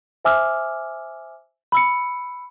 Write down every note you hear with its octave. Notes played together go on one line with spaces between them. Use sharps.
C5 E5 G#5 D6 E6 F6
B5 E6 C#7